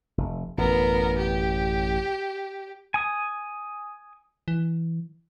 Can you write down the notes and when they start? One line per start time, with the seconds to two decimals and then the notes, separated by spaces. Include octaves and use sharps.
0.18 F1
0.58 A1 F#2 B3 A#4
1.18 G4
2.94 G#5 D#6
4.48 E3